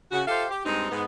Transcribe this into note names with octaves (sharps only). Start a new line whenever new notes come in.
C#3 F#4
F4 G4 A4 C5 E5 F5
G4
G2 G#3 C4 D#4
G#2 B3 D#4